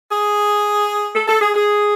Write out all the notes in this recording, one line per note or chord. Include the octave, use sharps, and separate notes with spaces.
G#4
A4
A4
G#4
G#4